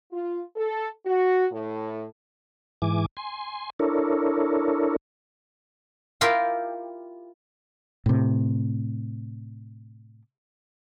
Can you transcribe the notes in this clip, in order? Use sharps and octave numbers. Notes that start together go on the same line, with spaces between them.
F4
A4
F#4
A2
G#2 E3 G#5 D6
G#5 C6
D4 E4 A4 A#4 C#5
E4 F4 G4 A#4
A2 C3